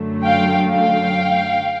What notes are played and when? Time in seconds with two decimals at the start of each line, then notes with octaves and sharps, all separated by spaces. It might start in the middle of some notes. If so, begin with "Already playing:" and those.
Already playing: F#2 D3 F#3 A3
0.24 F5 G5
0.68 F5 G5